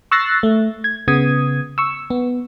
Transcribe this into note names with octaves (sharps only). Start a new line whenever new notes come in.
C#6 E6 F#6 A6 A#6 C7
A3
G#6
C#3 B3 D#6 G#6
C#6 E6
B3